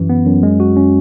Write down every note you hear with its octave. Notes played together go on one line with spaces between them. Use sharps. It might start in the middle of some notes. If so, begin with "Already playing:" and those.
Already playing: F#2 E3
B3
F#2
G#3
F#4
C#4